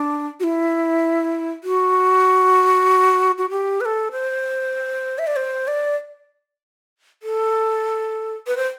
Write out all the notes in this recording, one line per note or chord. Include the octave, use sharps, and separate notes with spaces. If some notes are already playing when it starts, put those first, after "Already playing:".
Already playing: D4
F#4
E4
F#4
F#4
G4
B4
A4
C5
E5
D5
C5
D5
A4
B4
C5